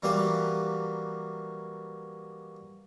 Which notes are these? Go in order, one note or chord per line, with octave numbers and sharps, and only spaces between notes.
E3 F#3 G3 A#3 G4 B4